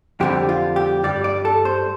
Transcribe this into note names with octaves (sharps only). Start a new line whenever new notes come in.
F2 D3 G3 G4
F4
G4
G2 G3 D5
D5
A4
C5